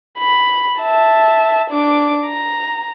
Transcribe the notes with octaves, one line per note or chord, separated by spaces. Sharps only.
B5
E5 A5
D4 D6
A#5